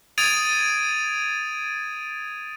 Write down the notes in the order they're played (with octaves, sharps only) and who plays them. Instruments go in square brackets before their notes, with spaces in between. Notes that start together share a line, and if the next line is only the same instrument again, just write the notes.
[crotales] D#6 G#6 A6 D7 D#7 F7